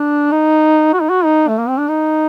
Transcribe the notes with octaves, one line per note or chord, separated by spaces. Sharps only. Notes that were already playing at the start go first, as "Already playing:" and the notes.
Already playing: D4
D#4
F#4
D#4
F#4
D#4
A3
A#3
C4
D4
D#4